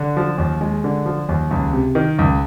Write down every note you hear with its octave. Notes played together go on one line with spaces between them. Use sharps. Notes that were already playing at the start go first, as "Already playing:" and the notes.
Already playing: D3
F3
D#2
G#3
D3
F3
D#2
C#2
C3
D#3
C#2